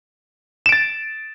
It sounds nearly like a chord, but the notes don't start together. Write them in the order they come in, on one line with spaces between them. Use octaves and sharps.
E7 D7 A6